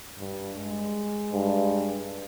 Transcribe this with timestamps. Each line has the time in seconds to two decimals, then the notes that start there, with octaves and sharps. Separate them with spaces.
0.18 G2
0.57 G#3
1.33 G2